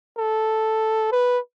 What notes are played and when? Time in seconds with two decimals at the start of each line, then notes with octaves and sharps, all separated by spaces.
0.18 A4
1.12 B4